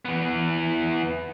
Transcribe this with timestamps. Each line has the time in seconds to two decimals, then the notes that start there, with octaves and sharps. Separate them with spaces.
0.05 E3 B3